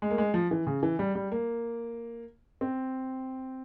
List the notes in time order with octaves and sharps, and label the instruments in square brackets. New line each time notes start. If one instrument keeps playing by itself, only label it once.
[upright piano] G#3
A#3
G#3
F3
E3
C#3
E3
G3
G3
A#3
C4